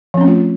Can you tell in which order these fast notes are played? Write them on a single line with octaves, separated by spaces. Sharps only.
F3 C4 C#4 A3 F4